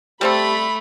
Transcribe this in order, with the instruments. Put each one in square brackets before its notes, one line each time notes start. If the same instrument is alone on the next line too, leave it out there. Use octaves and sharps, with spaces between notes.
[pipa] G3 C4 A4 [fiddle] A3 [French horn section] G4 [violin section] B5